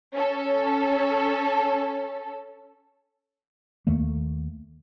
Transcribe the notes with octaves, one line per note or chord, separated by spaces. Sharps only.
C#4 A4
D#2 D#3 A3 A#3